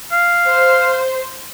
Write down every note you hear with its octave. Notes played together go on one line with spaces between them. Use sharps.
F5
C5